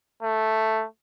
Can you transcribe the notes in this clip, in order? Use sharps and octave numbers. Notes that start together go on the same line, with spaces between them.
A3